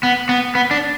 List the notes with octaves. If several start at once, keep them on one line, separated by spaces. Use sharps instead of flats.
B3
B3
B3
D4